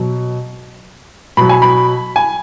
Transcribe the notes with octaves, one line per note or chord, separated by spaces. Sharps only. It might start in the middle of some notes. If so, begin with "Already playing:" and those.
Already playing: B2 F#3
B2 F#3 B5
G#5
B5
G#5